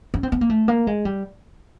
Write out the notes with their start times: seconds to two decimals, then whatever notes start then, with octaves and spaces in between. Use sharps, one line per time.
0.14 C#4
0.23 C4
0.32 B3
0.41 A#3
0.50 A3
0.68 A#3
0.87 G#3
1.05 G3